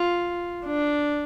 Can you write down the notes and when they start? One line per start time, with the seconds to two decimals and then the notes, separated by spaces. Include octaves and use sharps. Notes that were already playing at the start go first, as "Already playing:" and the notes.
Already playing: F4
0.66 D4